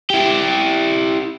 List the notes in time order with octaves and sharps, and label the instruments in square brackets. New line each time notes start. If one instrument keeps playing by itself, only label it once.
[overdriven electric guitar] E4 G4